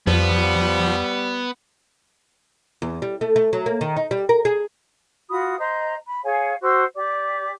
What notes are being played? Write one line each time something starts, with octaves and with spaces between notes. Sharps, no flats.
F2 F3 G3 B3
E2
G3
A3
A3
F#3
A#3
D#3
D#4
G3
A#4
G#4
F4 F#4 B5 D#6
C5 D#5 A#5
B5
G#4 C#5 F5 G#5
F#4 C5 E6
G4 D5 D6